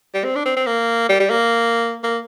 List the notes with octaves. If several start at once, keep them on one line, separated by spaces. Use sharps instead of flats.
G3
C4
D4
C4
C4
A#3
G3
G3
A#3
A#3